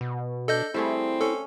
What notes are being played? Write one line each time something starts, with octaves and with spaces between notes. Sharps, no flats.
B2
D4 A4 D#5 G6
G3 A3 C4 E4 G#4
C#4 A4